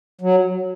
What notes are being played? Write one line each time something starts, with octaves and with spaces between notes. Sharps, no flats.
F#3